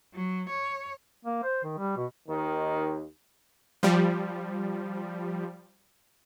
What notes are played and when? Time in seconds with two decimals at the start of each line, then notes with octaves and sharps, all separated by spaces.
0.14 F#3
0.49 C#5
1.25 A#3
1.43 C5
1.64 D#3
1.78 G3
1.97 B2
2.27 D#2 D#3
3.83 F3 G3